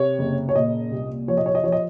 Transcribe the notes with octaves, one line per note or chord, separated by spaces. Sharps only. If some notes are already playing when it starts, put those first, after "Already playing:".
Already playing: C3 C#5
F#1
C#5
A#2 D#5
C2
F3 C#5
D#5
C#5
D#5
F3 C#5
D#5